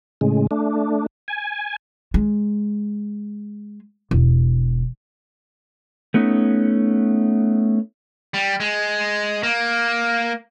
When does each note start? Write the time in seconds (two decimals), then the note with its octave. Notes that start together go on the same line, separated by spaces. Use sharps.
0.21 A2 C#3 G#3
0.51 A3 D4
1.28 G#5
2.14 G#3
4.11 E1
6.14 A3 B3 C#4 D#4
8.34 G3
8.60 G#3
9.43 A#3